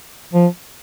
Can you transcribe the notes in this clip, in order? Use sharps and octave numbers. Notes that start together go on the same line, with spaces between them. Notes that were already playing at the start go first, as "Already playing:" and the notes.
F3